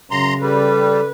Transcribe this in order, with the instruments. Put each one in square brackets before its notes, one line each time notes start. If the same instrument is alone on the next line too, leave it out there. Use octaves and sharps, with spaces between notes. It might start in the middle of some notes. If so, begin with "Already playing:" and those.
[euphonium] F#2 [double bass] C#3 [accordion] A#5 C6
[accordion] G3 [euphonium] A4 [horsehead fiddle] B4